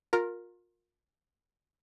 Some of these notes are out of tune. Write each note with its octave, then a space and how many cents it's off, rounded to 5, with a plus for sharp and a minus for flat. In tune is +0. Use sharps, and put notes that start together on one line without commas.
F4 +30 A#4 +0